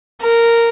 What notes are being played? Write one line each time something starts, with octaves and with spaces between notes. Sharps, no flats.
A#4